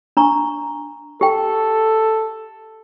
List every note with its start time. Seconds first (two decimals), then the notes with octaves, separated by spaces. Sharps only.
0.17 D4 A#5 C#6
1.21 G4 A4 G5